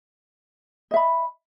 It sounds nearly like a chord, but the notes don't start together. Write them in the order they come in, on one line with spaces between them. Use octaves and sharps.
D#5 E5 B5